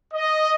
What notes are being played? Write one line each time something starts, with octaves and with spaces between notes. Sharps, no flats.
D#5